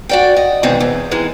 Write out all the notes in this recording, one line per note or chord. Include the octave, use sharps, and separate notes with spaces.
F#4 D5 G5
D#5
B2 D#3 E3 G#3 C4 D#4
E2
D#3 E3 G#3